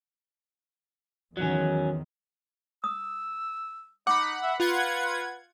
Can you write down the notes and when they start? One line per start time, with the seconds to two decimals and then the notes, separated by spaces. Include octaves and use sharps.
1.37 E2 D#3 F#3 C#4
2.84 D#6 E6
4.07 D#4 F#5 B5 D6
4.43 E5
4.60 F4 B4 F#5 G#6